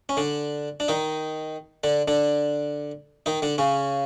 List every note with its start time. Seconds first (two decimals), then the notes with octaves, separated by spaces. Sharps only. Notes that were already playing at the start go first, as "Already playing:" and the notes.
0.09 C#4
0.17 D3 D4
0.80 D4
0.88 D#3 D#4
1.84 D3 D4
2.08 D3 D4
3.26 D#3 D#4
3.42 D3 D4
3.58 C#3 C#4